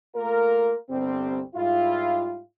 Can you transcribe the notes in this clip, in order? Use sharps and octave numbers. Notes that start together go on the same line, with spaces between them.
A3 A#3 F4 A#4
G1 C2 G3 C4
G#2 G3 E4 F4